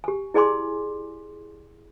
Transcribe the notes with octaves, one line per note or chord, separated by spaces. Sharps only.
G4 G#5
E4 G#4 D5 G#5 C6 D6